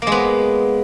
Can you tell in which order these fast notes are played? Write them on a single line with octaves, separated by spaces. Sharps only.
A#3 G#3 B3